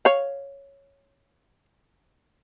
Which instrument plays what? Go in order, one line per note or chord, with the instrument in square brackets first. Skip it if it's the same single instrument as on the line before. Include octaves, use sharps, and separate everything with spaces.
[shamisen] C#5 F5